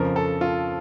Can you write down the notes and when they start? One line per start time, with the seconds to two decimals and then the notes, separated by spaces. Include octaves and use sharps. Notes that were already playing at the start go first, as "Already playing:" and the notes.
Already playing: F2 C#3 F3 A#4
0.16 A4
0.41 F4